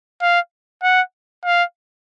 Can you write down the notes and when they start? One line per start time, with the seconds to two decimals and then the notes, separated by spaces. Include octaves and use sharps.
0.22 F5
0.83 F#5
1.45 F5